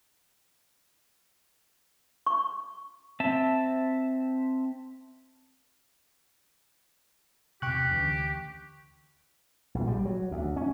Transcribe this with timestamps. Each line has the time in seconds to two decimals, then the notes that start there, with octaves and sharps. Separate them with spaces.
2.26 C#6
3.20 C4 E5 A5
7.62 E1 C3 G4 G5 C#6 F#6
7.91 D2 E3 C#4
9.74 A#1
9.88 G3
10.05 F#3
10.31 D2
10.56 C#4